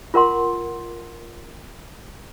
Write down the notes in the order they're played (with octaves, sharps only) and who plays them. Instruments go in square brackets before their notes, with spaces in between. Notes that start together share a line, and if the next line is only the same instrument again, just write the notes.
[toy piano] F4 A#4 F#5 C6